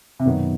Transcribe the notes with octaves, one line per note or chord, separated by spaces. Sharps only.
C3
F#2 B2 D#3 F#3 B3 D#4